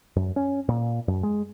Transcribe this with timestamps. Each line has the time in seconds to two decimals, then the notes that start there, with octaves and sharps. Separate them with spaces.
0.16 F#2
0.36 C#4
0.69 A#2
1.08 F#2
1.23 G#3